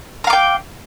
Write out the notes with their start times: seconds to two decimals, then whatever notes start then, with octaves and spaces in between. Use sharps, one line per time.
0.24 A#5
0.27 F5
0.30 D6
0.33 G5